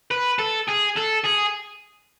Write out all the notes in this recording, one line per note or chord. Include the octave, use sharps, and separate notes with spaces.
B4
A4
G#4
A4
G#4